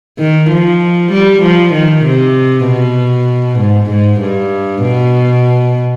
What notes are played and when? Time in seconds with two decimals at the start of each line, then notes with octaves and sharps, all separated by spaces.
0.19 D#3
0.50 F3
1.12 G3
1.42 F3
1.73 D#3
2.05 C3
2.66 B2
3.59 G#2
3.90 G#2
4.20 G2
4.82 B2